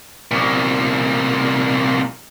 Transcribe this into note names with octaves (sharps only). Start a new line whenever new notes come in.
C2 A#2